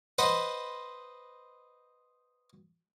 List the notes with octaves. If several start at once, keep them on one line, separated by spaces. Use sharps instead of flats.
B4 C5 D#5 F#5 A5 B5